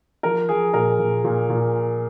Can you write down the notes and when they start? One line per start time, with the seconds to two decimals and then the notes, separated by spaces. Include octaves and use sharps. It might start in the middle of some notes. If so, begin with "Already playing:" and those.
0.23 F3 A#4
0.49 F3 G#4
0.73 A#2 A#4
0.99 A#2
1.24 A#2
1.50 A#2